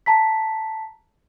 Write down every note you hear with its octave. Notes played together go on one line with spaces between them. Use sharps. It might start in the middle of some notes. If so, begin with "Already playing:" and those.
A5 A#5 B6